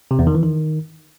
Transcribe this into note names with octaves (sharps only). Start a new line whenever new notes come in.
C3
E2
D#3
E3
D#3